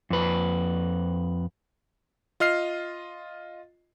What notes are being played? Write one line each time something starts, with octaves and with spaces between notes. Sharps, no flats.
F2 B4
F4 D#5 F6 C7